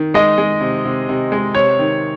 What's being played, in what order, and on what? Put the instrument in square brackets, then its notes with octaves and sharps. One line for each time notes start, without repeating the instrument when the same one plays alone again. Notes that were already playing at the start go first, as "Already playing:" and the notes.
Already playing: [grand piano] D#3
[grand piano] G#3 [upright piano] D#5
[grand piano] G#3
C3
C3
C3
G#3
[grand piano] C3 [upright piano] C#5
[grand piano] D#3